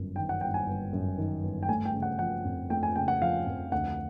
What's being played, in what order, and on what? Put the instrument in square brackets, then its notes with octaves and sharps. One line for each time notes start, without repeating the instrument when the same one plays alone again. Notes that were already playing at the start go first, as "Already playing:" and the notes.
Already playing: [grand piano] G1 F#2
D#3 G5
F#5
G1 G5
G#5
G1
F#2
D#3
G1
G5
A3 G#5
G5
C#3
F#5
F3 F#5
F2
A3 G5
G#5
C#3 G5
F#5
F3 F5
F2
D2 F#5